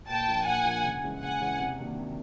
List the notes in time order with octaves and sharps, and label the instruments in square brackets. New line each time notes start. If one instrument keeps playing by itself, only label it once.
[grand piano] A#2 [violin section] G5 A5
[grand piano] F3 A#3 D4
[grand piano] A#2 [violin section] F#5 G#5
[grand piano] F3 A#3 D4
C#3
E3 G#3 C#4 E4
[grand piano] C#3 [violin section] F#5 G#5
[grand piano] E3 G#3 C#4 E4
C3
D#3 F#3 A#3 D4
C3